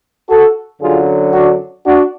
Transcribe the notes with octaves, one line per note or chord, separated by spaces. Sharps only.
F#4 A4
F#2 D3 F#3 F4 G#4
D4 F#4
D4 F#4